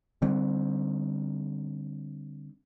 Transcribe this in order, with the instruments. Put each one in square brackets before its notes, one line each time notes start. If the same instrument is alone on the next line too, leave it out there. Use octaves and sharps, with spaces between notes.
[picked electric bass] D3 G3 C4